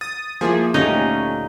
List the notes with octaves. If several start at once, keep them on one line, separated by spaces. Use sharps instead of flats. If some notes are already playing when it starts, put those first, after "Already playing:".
D#6 A6
F3 A#3 E4 G#4 E5
D2 A#2 A3 C#4 D#4 G4